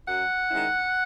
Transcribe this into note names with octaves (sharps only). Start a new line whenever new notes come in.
F#2 F#5
D#3 G#3 C#4 E4